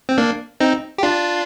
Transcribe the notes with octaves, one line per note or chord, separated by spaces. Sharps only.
C4
A#3 D4
C4 D#4
G4
D4 F4